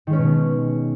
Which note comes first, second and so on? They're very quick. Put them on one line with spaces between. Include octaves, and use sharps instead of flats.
D#3 G#3 C#4 B3 B2